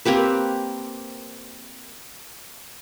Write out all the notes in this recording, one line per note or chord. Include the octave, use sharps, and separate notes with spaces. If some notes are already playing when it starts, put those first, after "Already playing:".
A#3 C4 G4 B4